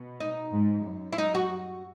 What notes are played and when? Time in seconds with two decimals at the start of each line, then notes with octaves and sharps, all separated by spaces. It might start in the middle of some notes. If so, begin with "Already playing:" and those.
Already playing: B2
0.20 D#4
0.52 G#2
0.85 F#2
1.13 E4
1.18 D#4
1.35 F#4